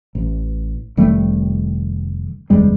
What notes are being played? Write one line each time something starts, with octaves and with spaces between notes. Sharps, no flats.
A1
F1 D#3 G3 A3
F#1 E2 G3 G#3